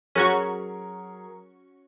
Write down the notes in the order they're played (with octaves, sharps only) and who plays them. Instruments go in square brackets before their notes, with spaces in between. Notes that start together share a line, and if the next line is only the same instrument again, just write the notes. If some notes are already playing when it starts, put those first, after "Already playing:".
[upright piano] F#3 G#4 A#4 [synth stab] C#4 F#4 C#6